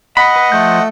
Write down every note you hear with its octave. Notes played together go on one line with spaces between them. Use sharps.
D#5 F#5 B5
B4
F3 A3 G6